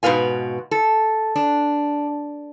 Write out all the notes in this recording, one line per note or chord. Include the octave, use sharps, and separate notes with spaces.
G#2 B2 B4 F5 G#5
A4
D4